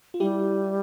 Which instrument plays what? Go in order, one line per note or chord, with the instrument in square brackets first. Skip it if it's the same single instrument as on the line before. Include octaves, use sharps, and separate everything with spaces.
[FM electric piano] F4
[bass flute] G3 [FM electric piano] E4 G4